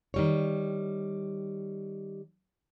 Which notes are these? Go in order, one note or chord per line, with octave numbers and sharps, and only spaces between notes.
D#3 G3 C#5